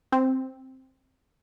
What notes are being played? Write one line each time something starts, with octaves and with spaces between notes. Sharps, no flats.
C4